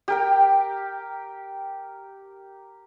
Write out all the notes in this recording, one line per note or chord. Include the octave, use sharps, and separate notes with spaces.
G4 A#4 G5